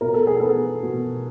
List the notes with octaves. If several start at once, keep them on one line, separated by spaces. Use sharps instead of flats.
B2 A#4
A4
G#4
B3 A4
B2